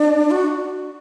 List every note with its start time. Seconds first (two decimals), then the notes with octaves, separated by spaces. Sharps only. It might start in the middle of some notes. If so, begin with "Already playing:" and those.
Already playing: D4
0.31 F#4